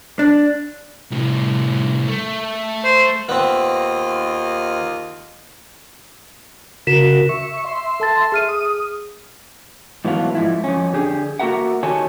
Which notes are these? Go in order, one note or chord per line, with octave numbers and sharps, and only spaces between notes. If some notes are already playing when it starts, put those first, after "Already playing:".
D4
C2 A2
A3
C5
D#2 B3 C4 F4 D#5
C#3 F#4 A#4 B6 E7
E5 C#6
E5 C6
A4 A5 A6
G#4 F6 D#7
D#6
G#2 E3 F#3 A3 B3 F5
G#2 F3 E4
F2 C#4
D3 G4 G#4
A#3 F#4 A4 A#4 E5 F#5
D#3 F#4 G4 A4 C#5 G#5